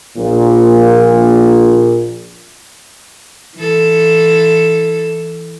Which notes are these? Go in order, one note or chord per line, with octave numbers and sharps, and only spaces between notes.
A#1 A#2
E3 A4